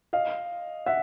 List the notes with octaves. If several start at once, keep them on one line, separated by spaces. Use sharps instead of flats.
D#5 F5
E5 F#5